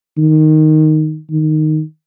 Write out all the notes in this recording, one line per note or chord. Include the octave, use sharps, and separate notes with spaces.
D#3
D#3